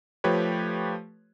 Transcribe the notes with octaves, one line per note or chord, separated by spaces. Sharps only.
F3 A3 G4 B4 C#5